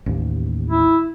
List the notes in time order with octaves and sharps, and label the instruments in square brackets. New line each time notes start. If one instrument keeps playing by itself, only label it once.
[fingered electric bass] A1 D#2
[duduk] E4